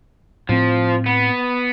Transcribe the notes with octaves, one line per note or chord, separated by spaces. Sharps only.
A2 F3 C4
B3